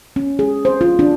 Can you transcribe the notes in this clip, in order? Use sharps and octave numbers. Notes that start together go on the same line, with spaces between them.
C#4
G#4
C5
F4
D4